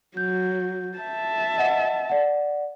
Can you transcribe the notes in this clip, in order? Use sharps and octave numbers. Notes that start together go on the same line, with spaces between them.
F#3 G6
E5 A5
D#5 F#5
D5 F#5